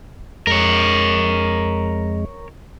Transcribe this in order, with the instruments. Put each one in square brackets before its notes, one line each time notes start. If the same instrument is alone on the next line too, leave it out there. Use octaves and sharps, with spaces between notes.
[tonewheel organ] F2 G#3 [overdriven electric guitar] A#4 C#5